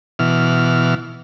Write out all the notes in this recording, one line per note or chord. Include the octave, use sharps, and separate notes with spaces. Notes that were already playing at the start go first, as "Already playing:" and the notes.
B2 E3 F6